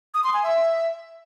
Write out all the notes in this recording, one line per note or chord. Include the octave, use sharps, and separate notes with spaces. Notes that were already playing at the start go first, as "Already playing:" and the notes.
D#6
C6
G#5
E5